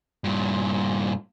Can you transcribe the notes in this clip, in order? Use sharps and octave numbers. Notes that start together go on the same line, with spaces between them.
G2 A#2